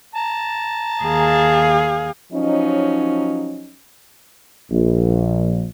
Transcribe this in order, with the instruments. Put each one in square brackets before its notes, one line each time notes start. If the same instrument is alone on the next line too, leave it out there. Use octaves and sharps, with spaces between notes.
[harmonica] A5 A#5
[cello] D#2 F5 [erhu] G#4
[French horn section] F3 F#3 C#4 D#4
[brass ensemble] A#1